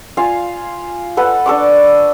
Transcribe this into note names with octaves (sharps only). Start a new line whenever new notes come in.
F4 F5 G#5
A4 B4 F#5
D4 A4 C#6 D6